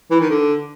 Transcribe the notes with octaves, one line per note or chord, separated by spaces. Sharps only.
E3
D#3
D3